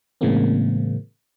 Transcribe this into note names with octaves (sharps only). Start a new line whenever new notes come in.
A2 C#3 E3 G#3 A#3 C4